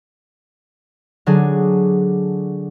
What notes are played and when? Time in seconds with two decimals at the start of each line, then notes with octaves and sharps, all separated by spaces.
1.26 D3 F#3 D4 G#4